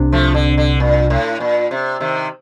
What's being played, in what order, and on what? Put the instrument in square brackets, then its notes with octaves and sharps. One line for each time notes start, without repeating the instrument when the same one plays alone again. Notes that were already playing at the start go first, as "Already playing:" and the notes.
Already playing: [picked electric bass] C2 C3 D4
[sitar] F3 A3
D3
D3
A#2
A2
A#2
C3
C3 D#3